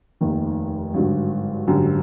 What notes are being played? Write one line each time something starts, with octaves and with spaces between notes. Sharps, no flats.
F1 D#2 D#3
G#1 G2 D3 F#3
G#1 F#2 D3 G3